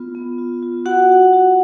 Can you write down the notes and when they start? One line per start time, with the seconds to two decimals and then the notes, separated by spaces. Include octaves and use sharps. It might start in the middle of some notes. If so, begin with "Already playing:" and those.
Already playing: B3 F4
0.15 B3
0.38 F4
0.62 F4
0.86 F#4 F#5
1.10 F#4
1.33 F#4